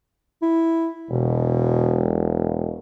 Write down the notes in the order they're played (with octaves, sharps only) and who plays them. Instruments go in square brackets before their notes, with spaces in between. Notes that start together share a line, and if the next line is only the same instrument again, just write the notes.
[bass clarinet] E4
[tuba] E1 [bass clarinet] B2